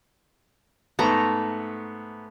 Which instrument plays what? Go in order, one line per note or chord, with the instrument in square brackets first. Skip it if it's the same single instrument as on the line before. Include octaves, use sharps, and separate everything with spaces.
[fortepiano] G#2 B3 [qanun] A3 A#5